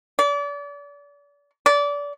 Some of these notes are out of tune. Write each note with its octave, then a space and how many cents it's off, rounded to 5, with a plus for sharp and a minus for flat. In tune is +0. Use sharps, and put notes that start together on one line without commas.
D5 -35
D5 -25